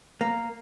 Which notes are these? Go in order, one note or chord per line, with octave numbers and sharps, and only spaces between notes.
A#3